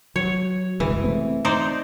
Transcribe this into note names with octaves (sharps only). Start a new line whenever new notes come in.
F#3 C#5
F#1 C2 E3 G#3
A3 C4
D#4 C5 D5